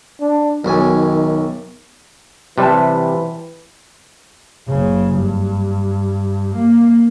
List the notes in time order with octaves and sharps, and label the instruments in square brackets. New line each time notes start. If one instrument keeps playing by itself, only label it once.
[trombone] D4
[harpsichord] B1 F#2 G#5 [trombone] D#3
[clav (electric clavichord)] C3 G3 [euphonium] E3 [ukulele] B4 E5 A5
[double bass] F#1 C#3
G2
A#3